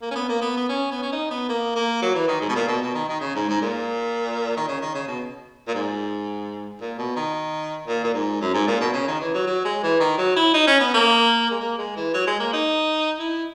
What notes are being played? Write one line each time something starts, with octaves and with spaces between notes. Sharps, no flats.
A#3
C#4
B3
A#3
B3
B3
C#4
B3
C#4
D#4
B3
A#3
A#3
F#3
E3
D#3
G#2
B2
A#2
B2
B2
D#3
D#3
C#3
G#2
G#2
A#2
D#3
C#3
D#3
C#3
B2
A#2
G#2
A#2
B2
D#3
A#2
A#2
G#2
F#2
G#2
A#2
B2
C#3
D#3
E3
F#3
F#3
G#3
E3
D#3
F#3
E4
D#4
C#4
B3
A#3
G#3
A#3
G#3
E3
F#3
G#3
A#3
D#4
E4